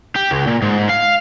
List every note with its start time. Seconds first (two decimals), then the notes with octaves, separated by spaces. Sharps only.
0.16 G4
0.31 C#2
0.47 A#2
0.62 G#2
0.89 F5